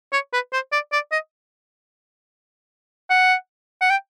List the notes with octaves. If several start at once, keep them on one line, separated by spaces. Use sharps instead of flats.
C#5
B4
C5
D5
D5
D#5
F#5
F#5
G5